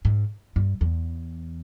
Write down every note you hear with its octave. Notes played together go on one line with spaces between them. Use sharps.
G#2
G2
E2